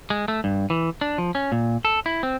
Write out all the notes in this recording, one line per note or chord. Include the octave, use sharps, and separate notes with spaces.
G#3
A3
G2
E3
D4
F3
C#4
A#2
A4
E4
C4